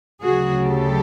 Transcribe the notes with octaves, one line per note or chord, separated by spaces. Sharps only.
D2 C#3 F#3 F#4 G#4
G4 A4